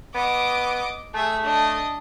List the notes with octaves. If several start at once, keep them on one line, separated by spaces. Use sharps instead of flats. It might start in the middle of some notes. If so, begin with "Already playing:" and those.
B3 D#5 D6
A3 G#4 E5
D4 D#5